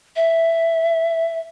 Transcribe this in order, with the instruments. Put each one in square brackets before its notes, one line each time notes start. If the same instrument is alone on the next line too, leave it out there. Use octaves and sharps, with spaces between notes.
[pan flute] E5